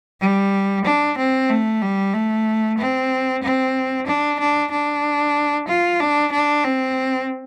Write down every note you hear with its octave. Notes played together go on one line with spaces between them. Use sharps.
G3
D4
C4
A3
G3
A3
C4
C4
D4
D4
D4
F4
D4
D4
C4